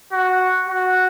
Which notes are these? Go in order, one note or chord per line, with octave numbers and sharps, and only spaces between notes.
F#4
F#4